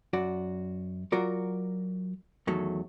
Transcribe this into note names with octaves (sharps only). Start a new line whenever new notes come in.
F#2 F#4 D5
F#3 F4 F#4 A#4 D5
E2 D#3 F#3 A3